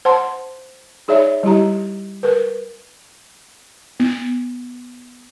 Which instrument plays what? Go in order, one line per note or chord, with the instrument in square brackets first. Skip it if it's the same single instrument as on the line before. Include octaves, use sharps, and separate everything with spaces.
[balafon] C5 F#5 A5 C6
D#4 G#4 C#5 D5 E5
G3 E4 G4 A#5
A#4 B4
B3